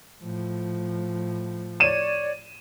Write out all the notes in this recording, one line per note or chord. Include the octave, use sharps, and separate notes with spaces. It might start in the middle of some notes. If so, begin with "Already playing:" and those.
A2 F3
C#5 D5 D#7 E7